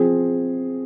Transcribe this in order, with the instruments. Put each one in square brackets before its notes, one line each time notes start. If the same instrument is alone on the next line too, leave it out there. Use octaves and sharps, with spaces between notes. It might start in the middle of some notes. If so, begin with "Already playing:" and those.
Already playing: [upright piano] F3 C4 G#4